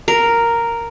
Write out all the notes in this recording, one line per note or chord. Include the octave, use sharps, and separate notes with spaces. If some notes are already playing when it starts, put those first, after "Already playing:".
A#4